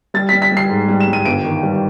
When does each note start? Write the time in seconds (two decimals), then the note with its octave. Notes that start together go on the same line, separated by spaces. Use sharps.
0.14 G3 A6
0.29 B6
0.33 G3
0.42 B6
0.52 G3 C7
0.70 G#2
0.88 G3
1.00 E7
1.08 G3
1.13 D#7
1.25 G1 D7
1.45 D#3
1.63 G3